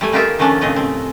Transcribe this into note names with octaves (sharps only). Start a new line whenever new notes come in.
G3 A3 G#5
G3 D#4 F4 G4 A#4 E5
D#3 F3 A3 C#4 D4
A2 C#3 C4 D#5
C4